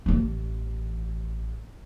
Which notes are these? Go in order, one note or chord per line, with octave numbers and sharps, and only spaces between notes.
A1 E3